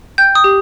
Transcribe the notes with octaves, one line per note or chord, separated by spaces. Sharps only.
G5 G6
D#6
G4